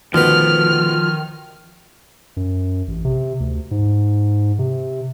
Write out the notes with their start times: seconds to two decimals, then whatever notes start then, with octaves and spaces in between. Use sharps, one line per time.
0.14 D2 B2 D#3 F3 B4 F6
2.37 F#2
2.88 A1
3.05 C3
3.40 D2
3.71 G#2
4.59 C3